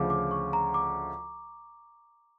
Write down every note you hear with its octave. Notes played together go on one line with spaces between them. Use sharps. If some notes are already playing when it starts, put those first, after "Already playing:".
Already playing: D2 C#3 F3 D6
D6
C#6
A#5
D6